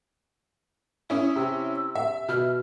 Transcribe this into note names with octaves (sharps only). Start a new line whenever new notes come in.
C#4 E4 D#6
C3 E6
E5
B2 F6